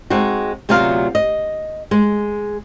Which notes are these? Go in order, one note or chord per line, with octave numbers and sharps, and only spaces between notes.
G#3 C4 D#4 F#4
D2 C3 F#3 B3 F4 F5
D#5
G#3